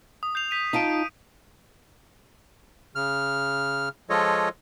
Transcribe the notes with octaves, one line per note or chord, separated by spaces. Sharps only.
D#6
G6 C7 F7
G6 B6 D#7
D#4 F4 A5 D7 D#7 F7
C#3 F6
F3 G#3 F4 A4 C#5 D#5